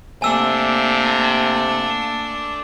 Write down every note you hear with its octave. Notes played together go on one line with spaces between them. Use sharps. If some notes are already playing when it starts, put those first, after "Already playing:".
C3 A3 A#3 D4 G#5 E6